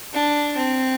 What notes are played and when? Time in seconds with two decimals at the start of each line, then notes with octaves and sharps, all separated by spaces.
0.13 D4
0.57 C4